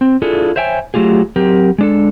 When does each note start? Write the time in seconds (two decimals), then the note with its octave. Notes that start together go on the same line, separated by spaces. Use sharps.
0.01 C4
0.22 D4 E4 F4 G#4 A4
0.56 C5 C#5 E5 G5 G#5
0.94 F#3 A3 F4 G4 G#4
1.36 F#3 C4 G4 A#4
1.78 G#3 D4 A4